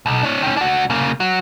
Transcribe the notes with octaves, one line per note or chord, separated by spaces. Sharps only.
B1
D4 C#5
D#3 C#4
D4 F#4
C#3 A#3
F#3